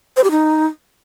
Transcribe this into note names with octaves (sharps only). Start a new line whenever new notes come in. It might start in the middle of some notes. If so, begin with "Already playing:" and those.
C5
G4
D#4